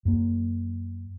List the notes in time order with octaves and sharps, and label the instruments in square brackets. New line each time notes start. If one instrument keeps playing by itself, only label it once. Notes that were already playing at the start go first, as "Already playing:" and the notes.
[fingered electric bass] F#2 A#3